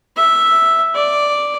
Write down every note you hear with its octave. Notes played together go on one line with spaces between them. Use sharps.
E5
D5